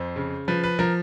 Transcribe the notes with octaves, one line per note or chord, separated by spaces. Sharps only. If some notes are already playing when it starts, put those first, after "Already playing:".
Already playing: F2 C5
C#3
F3 B4
B4
F3 A#4